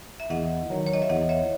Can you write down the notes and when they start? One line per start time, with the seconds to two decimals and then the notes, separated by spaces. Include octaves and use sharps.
0.20 E5
0.30 E2 D#5 F#5
0.70 D#3 F#3
0.87 C#5
0.93 D#5
1.02 E5
1.09 E2 D#5 F#5
1.29 C#5 E5